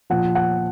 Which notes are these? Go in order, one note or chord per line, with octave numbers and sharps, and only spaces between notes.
A#2 F3 F#5
F#5